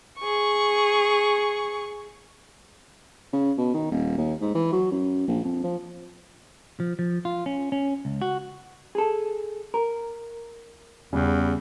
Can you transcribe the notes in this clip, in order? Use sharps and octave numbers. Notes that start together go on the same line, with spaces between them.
G#4 C#6
C#3
B2
D#3
D#1
D#2
G#2
E3
F#3
F#2
A#1
F2
F3
F3
F3
F4
C#4
C#4
C#2
F#4
G#4 A4
A#4
E2 C#3 G3